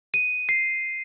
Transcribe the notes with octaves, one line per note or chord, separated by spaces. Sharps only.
D#7
C7